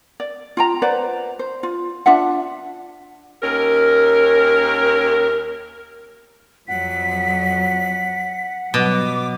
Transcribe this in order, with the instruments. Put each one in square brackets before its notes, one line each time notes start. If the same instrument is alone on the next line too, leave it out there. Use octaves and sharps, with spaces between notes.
[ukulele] D5
F4 G5 A#5
B4 C5 D5 F#5
C5
F4
D4 F4 E5 F#5
[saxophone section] D#2 C#4 A#4
[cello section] F2 F#3 [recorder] F#5 [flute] B6
[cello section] G2 F#3 [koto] B2 [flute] D6